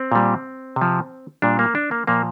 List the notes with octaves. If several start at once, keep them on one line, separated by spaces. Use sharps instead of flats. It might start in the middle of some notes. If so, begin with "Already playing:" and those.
Already playing: C4
A#2 G3
C3
F3
A#2 G3 D4
A#3
D4
A#3
A#2 F3 A#3